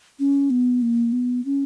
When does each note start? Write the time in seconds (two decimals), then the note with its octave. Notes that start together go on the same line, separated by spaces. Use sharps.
0.19 C#4
0.50 B3
0.82 A#3
1.12 B3
1.45 C#4